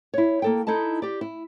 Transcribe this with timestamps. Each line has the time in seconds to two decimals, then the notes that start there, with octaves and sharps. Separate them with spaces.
0.14 E4 C#5
0.42 A#3 A4 G5
0.67 D#4 E4 A4 D#5 A5
1.02 G4 D5
1.21 E4